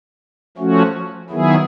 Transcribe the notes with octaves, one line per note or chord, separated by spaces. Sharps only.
F3 A3 C#4 F#4
D#3 F#3 B3 E4 G#4